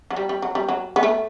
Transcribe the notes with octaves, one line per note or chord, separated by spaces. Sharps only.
F#3
G3
G3
F#3
G3
F#3
B3
A3